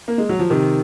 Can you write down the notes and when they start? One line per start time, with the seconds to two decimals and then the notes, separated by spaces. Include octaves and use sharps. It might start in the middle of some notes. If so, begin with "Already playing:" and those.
0.08 A#3
0.18 G#3
0.29 F#3
0.39 F3
0.50 C3 D#3